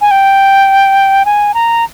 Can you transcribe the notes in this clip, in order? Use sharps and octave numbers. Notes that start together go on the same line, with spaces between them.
G#5
G5
G#5
A#5